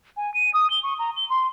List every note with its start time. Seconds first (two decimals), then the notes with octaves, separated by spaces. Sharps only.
0.17 G#5
0.34 D#7
0.54 D#6
0.70 G7
0.83 C#6
0.99 A#5
1.16 G7
1.30 C6